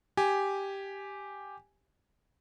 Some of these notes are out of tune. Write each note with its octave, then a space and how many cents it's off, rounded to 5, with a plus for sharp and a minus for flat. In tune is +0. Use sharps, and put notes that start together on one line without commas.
G4 +0 G#5 +0